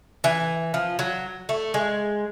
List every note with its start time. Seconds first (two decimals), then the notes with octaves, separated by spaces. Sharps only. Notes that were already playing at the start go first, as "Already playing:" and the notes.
0.24 E3
0.74 F3
0.99 F#3
1.49 A3
1.74 G#3